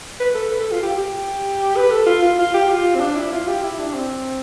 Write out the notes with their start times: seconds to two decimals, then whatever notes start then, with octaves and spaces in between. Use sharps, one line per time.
0.20 B4
0.35 A4
0.51 B4
0.61 A4
0.71 F4
0.83 G4
0.98 G4
1.76 B4
1.91 A4
2.06 F4
2.22 F4
2.39 F4
2.54 G4
2.69 F4
2.95 C4
3.00 D4
3.16 E4
3.32 F4
3.48 G4
3.63 E4
3.79 D4
3.94 C4